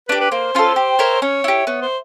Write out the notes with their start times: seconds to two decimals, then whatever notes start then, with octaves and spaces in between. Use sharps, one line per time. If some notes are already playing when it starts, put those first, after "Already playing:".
0.08 D4 G4 B4
0.21 B4
0.31 A#3 C5
0.55 C#4 F4 A4
0.76 G4
0.99 A#4 C#5 E5
1.22 C#4 C#5
1.44 E4 G4
1.67 B3 C#5
1.82 C5